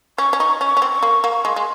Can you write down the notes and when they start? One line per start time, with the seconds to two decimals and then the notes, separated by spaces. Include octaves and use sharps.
0.18 C#4 C#6
0.33 C#4
0.40 D#4 C#6
0.61 C#4
0.66 C#6
0.77 C#4
0.82 C4
0.92 C#6
1.03 A#3
1.24 A#3
1.44 G#3 C6
1.56 G#3